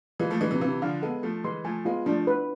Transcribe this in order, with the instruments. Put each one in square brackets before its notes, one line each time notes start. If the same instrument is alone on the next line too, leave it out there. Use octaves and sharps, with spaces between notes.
[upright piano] E3 G#3 [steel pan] F4
[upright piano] F3 A3
[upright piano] E3 G#3 [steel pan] D4
[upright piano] C3 E3
[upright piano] C3 E3 [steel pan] F5
[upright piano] D3 F3 [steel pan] F5
[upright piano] G#3 B3 [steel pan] A4
[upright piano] F3 A3 [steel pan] A4
[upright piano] E3 G#3 [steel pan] C6
[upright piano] F3 A3 [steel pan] G#5
[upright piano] G#3 B3 [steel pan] F4
[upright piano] F3 A3 [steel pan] D4
[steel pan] B4